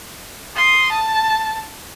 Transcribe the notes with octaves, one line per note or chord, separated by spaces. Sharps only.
C6 D#6
A5